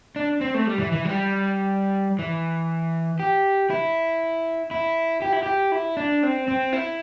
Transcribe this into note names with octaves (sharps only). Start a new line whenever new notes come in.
D4
C4
A3
G3
E3
E3
G3
E3
G4
E4
E4
G4
E4
G4
E4
D4
C4
C4
E4